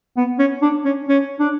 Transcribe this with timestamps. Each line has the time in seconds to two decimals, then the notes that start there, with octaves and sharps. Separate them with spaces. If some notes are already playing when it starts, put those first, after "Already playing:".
0.17 B3
0.39 C#4
0.62 D4
0.85 C#4
1.08 C#4
1.39 D4